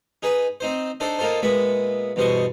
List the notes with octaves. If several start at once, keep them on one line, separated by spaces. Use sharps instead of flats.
D#4 G#4 B4
C4 D#4 C5
D4 D#4 A4 C5 D5
A#3 D#4 F4 A4 C5
A#2 G#3 B3 E5 B5
E2 G2 B2 C5 D#5 C#6